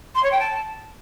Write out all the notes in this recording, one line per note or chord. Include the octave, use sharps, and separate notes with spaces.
C6
C#5
G5
A5